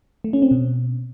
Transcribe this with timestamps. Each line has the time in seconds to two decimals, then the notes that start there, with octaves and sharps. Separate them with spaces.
0.24 A3
0.33 C#4
0.42 C4
0.51 B2